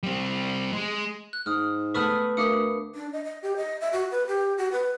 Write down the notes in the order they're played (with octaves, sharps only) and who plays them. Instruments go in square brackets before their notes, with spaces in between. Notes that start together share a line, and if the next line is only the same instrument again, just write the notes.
[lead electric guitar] G3 C4
G#3
[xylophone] F#6
[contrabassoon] G#2 [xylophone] D#6 F6
[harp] A3 B3 B4 [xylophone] C#6 D#6 F6
[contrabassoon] D2 [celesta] A#4 D6 C#7 [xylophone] E5 F5 D#6
[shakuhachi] D4
D#5
D#5
G4
D#5
E5
F#4
B4
G4
F#4
B4